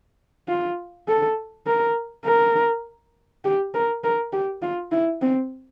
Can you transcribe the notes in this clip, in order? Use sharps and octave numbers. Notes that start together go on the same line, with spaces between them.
F4
A4
A#4
A#4
G4
A#4
A#4
G4
F4
E4
C4